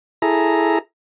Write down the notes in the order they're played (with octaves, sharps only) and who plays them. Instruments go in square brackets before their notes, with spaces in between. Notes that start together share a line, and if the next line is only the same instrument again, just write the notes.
[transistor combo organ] E4 G#4 A4 A#5